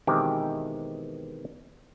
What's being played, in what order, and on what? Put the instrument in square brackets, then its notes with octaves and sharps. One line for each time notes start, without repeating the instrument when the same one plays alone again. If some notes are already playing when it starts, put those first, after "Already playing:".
[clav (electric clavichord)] B2 D#3 E3 G#3 C4 G4